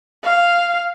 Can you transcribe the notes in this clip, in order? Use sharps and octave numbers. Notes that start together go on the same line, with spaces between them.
F5